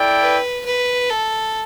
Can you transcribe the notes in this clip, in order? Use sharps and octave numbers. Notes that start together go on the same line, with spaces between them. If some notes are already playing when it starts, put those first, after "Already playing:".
Already playing: E4 A4 D5 G5
B4
B4
A4